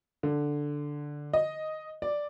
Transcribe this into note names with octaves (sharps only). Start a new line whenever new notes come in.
D3
D#5
D5